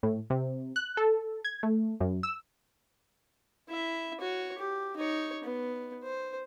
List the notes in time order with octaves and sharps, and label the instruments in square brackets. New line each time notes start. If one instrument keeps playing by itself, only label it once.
[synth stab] A2
C3
F#6
A4
G#6
A3
F#2
E6
[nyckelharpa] E4 E5
F#4 C#5
G4
D#4 C#5
B3
C5